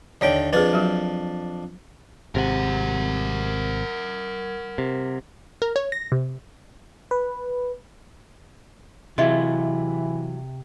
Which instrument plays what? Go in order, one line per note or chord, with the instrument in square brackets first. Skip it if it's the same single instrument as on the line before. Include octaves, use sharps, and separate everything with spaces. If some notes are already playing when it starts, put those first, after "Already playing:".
[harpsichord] D#2 D3 G5 [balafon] C#5 D5
[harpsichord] F2 D4 A5 [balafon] G#4 B4
[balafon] F#3 F#4
[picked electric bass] G#1 C3 [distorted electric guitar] A#4 F#5
[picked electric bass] C3
[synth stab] A#4
C#5
A#6
C3
[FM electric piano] B4
[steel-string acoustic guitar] C3 [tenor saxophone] E3 [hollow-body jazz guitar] F#3 E4 F4 [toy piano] G#4 D#5 E5